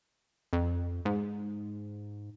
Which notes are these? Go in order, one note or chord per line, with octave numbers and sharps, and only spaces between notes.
F2
G#2